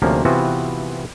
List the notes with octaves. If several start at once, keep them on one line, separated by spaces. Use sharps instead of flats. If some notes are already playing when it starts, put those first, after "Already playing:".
D2 C3 F3 A#3 C#4
C3 E3 B3 C4 F4 F#4